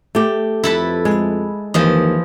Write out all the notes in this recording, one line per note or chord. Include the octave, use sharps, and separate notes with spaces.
A3 G4
F2 E4 A4 B4
G#3
D#2 E3 F3 D#5